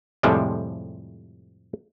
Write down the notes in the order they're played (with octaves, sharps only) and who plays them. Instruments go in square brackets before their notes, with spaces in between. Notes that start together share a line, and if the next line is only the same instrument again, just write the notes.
[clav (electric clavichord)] F2 A2 C3 F3 G3 G#3